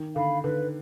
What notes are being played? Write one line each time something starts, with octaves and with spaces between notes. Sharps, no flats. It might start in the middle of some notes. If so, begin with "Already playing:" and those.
Already playing: D#3
D3 F5 B5
D3 B4